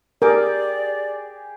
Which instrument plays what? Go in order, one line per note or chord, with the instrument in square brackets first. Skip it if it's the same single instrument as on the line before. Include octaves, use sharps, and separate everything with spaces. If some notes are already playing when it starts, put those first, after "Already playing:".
[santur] G4 G#4 D6 [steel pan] A#4 [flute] D5